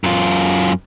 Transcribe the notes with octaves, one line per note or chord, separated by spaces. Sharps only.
F#2 F4